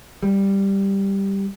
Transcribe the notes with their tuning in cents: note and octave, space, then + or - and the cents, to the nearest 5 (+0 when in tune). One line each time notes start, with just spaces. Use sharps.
G3 +5